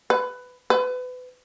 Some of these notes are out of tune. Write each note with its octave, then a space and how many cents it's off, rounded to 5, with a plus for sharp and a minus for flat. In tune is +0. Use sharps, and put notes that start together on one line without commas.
B4 +15
B4 +30